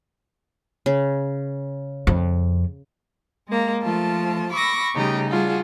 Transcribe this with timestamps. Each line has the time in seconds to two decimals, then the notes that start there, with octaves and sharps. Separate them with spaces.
0.86 C#3
2.07 F2
3.47 G#3 A#3
3.82 F3 A3 F4 A5
4.52 B5 C#6 D6 E6 A#6
4.95 C#3 G3 A3 D#4 G4 G#4
5.29 G3 D4 F4 F#4 G#4